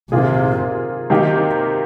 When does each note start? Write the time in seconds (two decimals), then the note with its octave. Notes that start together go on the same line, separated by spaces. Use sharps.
0.11 C3 D#3 A#3 F4 G#4
1.10 C3 D#3 A#3 D#4 G4